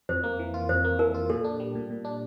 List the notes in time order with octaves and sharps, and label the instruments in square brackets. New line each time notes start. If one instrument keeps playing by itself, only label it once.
[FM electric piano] F2 [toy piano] C5
[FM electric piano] A#3
E3
F4
[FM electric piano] F2 [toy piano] C5
[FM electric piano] A#3
[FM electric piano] E3 [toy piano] A#4
[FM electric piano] F4
[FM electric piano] A#2 [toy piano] A4
[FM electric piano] D4
G3
A#2
A#2
D4